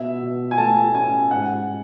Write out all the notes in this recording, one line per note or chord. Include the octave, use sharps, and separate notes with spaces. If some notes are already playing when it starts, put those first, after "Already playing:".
Already playing: B2 E5
B2
G#5
A3 A5
C#4 G#5
G#2 F#5